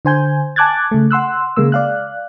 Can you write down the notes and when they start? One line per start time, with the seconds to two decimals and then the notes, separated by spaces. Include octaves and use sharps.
0.05 D3 C5 G#5 G6
0.56 G#5 A5 D6 F#6 G#6 A6
0.91 C#3 A3
1.11 F#5 C6 E6 F#6
1.56 C#3 G#3 A#3 E6
1.72 D5 F5 F#6